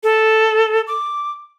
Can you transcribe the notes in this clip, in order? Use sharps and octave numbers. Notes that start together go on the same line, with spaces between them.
A4
D6